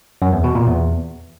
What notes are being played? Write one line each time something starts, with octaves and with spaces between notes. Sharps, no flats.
F#2
E2
B2
A#2
E2